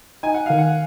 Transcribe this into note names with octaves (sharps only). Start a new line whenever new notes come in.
D#4 G#5
F#5
D#3 F5
F#5